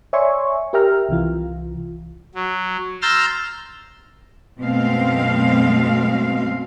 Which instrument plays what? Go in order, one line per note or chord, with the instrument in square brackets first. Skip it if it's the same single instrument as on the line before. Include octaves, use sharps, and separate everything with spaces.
[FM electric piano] C#5 D5 E5 G#5 C6 C#6
G4 A#4 E5 G5 A#5 F6
C2 C3 E3 F4
[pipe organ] F#3
A#5 C6 E6 F6 G6 A6
[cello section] F#2 B2 G#3 A3 C4 F5